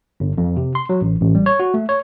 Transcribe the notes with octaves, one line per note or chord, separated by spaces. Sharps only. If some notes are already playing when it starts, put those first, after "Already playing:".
G1
F2
C3
C6
F#3
A1
A1
G3
C#5
F#4
A3
C#5